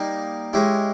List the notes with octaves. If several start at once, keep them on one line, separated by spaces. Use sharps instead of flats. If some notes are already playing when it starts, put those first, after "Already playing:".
Already playing: G3 A#3 D#4
G#3 C#4 E4 G4